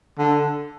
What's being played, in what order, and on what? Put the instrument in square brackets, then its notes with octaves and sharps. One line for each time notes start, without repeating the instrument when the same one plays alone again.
[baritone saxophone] D3